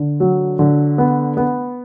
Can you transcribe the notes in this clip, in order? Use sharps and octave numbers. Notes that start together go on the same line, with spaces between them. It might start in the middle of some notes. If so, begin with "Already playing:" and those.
Already playing: D3
F#3
D3
B3
B3